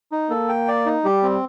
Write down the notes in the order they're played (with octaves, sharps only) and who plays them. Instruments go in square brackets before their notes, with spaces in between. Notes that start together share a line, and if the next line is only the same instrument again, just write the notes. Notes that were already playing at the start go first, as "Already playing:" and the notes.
[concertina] D#4
[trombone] A#3 [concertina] A4
[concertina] G5
D5
D#4
[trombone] G3 [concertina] G4
[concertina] C4